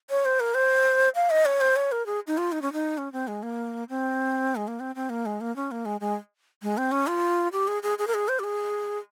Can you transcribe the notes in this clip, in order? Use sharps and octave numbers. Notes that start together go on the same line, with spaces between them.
C#5
C5
A#4
C5
F5
D#5
C#5
C5
C#5
A#4
G#4
D#4
F4
D#4
C#4
D#4
C#4
C4
G#3
A#3
C4
G#3
A#3
C4
C4
A#3
G#3
A#3
C#4
A#3
G#3
G#3
G#3
C4
C#4
F4
G4
G#4
G#4
G#4
A#4
G#4
C5
G4
G#4